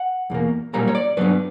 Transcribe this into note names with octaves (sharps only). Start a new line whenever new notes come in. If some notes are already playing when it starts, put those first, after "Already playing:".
Already playing: F#5
E2 B2 A#3
B1 A#2 G3 A#3 C#4 A#5
C#5
D5
G2 F#3 B3 D4 B4